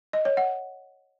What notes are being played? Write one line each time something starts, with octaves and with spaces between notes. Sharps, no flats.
D#5
C#5
F#5